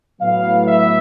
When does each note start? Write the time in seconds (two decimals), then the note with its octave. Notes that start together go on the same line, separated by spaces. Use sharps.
0.21 A2 F#3 B3 F5
0.68 E5